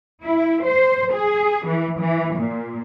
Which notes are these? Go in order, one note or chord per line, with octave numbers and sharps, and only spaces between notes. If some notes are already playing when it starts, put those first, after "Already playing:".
E4
C5
G#4
E3
E3
A#2